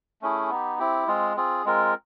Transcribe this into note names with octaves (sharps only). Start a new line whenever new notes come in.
A3 C#4 E4 G#4
B3 D#4 G4
C4 E4 G4
G#3 C4 F4 G#4
C4 F4 G#4
G#3 C4 F4 A#4